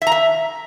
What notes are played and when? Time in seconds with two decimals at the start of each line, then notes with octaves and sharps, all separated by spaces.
0.02 E5
0.07 A#5
0.12 E5